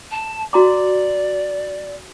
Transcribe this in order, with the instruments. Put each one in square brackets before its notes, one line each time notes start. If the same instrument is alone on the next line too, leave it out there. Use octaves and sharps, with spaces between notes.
[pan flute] A5
[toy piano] F#4 A#5 D6 [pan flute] D5